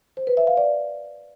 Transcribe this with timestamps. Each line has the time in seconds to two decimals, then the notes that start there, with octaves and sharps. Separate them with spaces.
0.17 C5
0.27 B4
0.37 E5
0.47 F5
0.57 D5